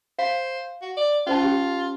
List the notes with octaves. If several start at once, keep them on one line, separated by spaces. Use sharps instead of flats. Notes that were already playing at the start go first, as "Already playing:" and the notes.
C5 F5
F#4
D5
C#4 F4 C5 A5
C#4 G4